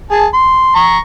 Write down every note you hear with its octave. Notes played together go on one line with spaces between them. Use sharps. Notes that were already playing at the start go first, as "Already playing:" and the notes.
G#4 A5
C6
A#5 C#6